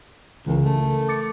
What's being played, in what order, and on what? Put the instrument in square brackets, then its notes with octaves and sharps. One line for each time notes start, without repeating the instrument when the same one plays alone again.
[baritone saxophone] C#2 [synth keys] C#3 E3 A#4
[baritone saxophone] A3
[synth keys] D6 A6 C#7